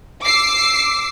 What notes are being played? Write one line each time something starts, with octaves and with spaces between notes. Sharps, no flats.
D6 E6 C7